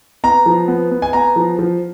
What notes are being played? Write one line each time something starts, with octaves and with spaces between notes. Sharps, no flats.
B3 A#5
F3
B3
B3
G#5
B3 A#5
F3
F3